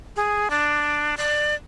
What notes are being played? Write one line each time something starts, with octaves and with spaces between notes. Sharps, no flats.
G#4
D4
D5